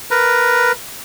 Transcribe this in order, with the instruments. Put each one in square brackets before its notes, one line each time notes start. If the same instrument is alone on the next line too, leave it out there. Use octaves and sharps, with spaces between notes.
[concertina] A#4 B4